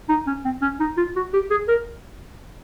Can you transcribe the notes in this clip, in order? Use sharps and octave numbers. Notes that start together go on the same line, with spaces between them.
D#4
C#4
C4
C#4
D#4
F4
F#4
G4
G#4
A#4